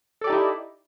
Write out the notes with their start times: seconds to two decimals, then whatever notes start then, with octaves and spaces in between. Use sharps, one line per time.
0.21 A4
0.24 D5
0.27 G4
0.30 D#4
0.32 E4